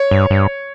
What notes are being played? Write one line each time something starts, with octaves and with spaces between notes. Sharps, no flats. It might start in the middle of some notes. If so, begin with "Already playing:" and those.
Already playing: C#5
G2
G2